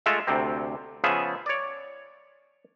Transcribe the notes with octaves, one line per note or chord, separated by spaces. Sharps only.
G#3 A3 F4 A4 E5 F5
D2 C3 C4
C#3 F3 B3 G#4 E5
C#5 D5